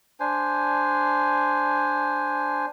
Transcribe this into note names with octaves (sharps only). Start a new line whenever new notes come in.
D4 C5 G#5